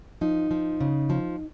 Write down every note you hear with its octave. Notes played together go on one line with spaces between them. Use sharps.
F3 D#4
F3
C#3
F3